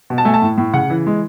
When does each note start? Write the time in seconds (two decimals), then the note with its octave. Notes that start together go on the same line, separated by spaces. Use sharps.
0.10 B2
0.18 A5
0.25 A3 G#5
0.34 A5
0.42 A2
0.58 A2
0.74 C#3 F#5
0.90 E3
1.07 G#3